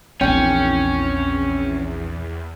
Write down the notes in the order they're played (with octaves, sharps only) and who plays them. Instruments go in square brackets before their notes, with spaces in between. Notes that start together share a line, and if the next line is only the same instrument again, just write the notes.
[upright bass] A#1 C4 [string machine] E2 [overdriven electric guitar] C#4 [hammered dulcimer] G5